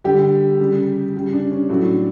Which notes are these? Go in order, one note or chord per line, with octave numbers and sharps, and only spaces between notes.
D3 G3 G4
C#3 G3
C#3 G3
D4
C#4
A2 F#3 A3 D4